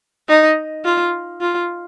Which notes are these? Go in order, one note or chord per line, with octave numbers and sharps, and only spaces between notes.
D#4
F4
F4